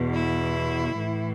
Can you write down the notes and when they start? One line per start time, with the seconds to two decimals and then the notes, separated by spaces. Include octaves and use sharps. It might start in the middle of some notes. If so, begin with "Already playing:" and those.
Already playing: E2 B2
0.14 E4
0.96 A2 E3